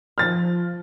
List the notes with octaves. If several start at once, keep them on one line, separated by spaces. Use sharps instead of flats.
F3 F6 A6